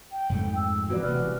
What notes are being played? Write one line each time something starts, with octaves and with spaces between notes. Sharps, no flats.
G5
F2 G#2 A3
E6
E3 A#3 C4 F#4 B4 D5
E1 A1 C3 F6